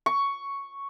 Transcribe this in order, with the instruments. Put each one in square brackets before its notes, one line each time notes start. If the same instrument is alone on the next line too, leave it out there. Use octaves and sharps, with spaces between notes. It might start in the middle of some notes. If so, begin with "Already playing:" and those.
[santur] C#6